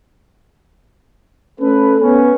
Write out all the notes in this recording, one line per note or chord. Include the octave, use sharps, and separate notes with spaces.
A3 C#4 A4 B4
B3 C#4